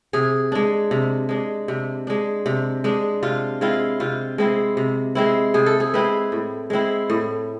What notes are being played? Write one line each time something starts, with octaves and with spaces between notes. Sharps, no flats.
C3 G#4
G#3 D4
C3
G#3 D4
C3
G#3 D4
C3
G#3 D4
C3 F4
G#3 C4 E4 F4
C3 F4
G#3 C4 E4
C3
G#3 C4 E4
C3 G#4
A4
G#4
G#3 C4 E4 B4
A2
G#3 C4 E4
A2